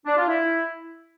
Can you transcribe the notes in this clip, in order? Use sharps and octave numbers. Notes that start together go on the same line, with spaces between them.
D4
F4
E4